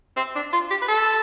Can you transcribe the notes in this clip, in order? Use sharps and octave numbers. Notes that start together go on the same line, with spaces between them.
C4
D4
F4
G4
B4
A4